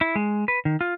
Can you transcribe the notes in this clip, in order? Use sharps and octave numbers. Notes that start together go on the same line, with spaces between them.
E4
G#3
B4
D#3
F4